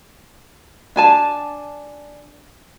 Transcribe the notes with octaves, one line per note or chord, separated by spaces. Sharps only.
D4 G#5 A5